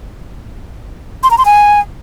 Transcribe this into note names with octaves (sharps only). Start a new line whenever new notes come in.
C6
A#5
C6
G#5